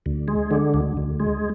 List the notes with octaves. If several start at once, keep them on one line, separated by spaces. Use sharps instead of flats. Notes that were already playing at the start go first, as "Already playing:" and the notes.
D2
G#3
D3
D2
D2
G#3